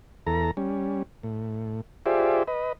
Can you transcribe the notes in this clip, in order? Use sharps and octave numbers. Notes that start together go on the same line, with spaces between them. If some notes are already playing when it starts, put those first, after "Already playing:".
E2 A4 A#5
G3 C#4
A2
F4 G4 G#4 C5 D5 E5
B4 D#5